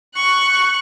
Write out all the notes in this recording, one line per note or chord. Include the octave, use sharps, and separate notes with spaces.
C#6 F#6